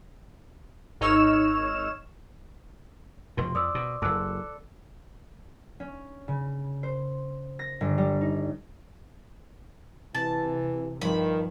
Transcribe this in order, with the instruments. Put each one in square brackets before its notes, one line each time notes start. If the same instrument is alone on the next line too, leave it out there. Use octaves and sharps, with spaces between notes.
[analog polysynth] G#1 D#4 C#5 E6 F6 E7
[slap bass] F1 B2 [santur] C5
[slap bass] F2 [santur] D5 [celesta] D#6 E6
[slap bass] B2
[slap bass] F#1 F#2 [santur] A4 [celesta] D6 E6 F#6
[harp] C#4
C#3
C5
A#6
G1
G3
D#4
[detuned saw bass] C3 [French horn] E3 [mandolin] A5
[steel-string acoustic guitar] G2 F3 [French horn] D#3 [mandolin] B5